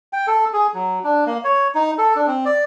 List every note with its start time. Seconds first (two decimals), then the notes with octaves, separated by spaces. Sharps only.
0.13 G5
0.27 A4
0.53 G#4
0.74 F#3
1.04 D4
1.26 A#3
1.44 C#5
1.75 D#4
1.98 A4
2.16 D4
2.27 C4
2.45 D5